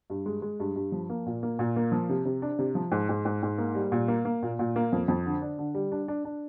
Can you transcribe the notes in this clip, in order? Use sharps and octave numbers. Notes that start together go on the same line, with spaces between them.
G2
G#3
G#3
G2
G2
F3
A#3
A#2
A#3
A#2
A#3
F3
C3
C3
D4
C3
F3
G#2
G#2
G#2
G#2
A#3
G3
A#2
A#3
A#3
A#2
A#2
A#3
F2
F2
D3
D4
D3
G3
D4
D4
D4